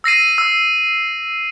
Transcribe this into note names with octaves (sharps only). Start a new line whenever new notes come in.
E6 A#6 C7 D#7
E6